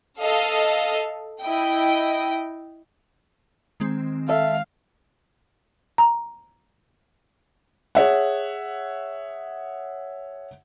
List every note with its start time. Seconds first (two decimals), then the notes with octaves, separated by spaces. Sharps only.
0.19 A4 D#5 F5
1.40 E4 D#5 G5
3.80 D#3 G#3 C4
4.29 A4 E5 F5
5.98 A#5
7.95 G#4 C#5 E5 F#5